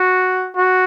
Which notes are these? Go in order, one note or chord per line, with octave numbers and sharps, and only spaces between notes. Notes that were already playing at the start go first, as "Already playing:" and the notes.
Already playing: F#4
F#4